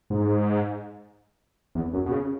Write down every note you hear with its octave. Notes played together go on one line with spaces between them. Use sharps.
G#2
E2
F#2
B2
C#3